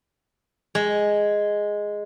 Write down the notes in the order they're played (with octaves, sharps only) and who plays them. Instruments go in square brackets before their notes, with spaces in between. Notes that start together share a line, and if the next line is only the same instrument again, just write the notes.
[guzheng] G#3